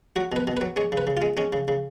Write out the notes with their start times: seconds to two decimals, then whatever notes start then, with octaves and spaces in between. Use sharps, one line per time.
0.16 F#3 F#4
0.32 B2 B4
0.47 B2
0.57 F#3 B4
0.76 G#3 C#5
0.92 C#3
0.97 B4
1.07 C#3
1.17 G#3 F4
1.37 G#3 C#4
1.53 C#3
1.68 C#3